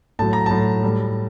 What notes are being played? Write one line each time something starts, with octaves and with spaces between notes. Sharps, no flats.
A2 F#3 A5
A#5
A2 F#3 A5
A2 G3